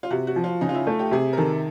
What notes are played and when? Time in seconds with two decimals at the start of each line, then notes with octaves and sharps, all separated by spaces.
0.03 F4
0.10 C3 F#4
0.27 F#4
0.36 F3
0.44 F4
0.61 C#3 D#4
0.69 F4
0.74 E4
0.87 A3
0.99 G4
1.11 C3 G#4
1.33 A#4
1.37 D#3 A4